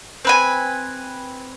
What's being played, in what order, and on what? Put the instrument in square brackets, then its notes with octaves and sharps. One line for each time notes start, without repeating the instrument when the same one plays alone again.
[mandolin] C4 B4 G#5